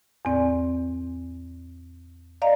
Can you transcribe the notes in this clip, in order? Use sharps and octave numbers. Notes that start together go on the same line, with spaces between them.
E2 A2 C4 D5
D5 D#5 F5 A#5